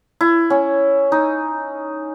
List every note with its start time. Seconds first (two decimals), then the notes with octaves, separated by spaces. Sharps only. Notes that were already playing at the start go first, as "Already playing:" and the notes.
0.21 E4
0.50 C#4
1.12 D#4